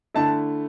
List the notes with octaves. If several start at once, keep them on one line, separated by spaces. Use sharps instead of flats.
D3 A3 E4 A5